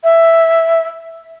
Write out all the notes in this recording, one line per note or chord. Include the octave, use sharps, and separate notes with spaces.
E5